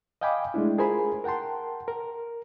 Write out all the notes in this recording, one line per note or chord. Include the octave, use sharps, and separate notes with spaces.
D#5 F5 G5 G#5 B5 D6
G#3 A3 D4 E4
F4 G#4 A#4 C5 G#5 B5
A#4 F#5 G5 A5 C6
A#4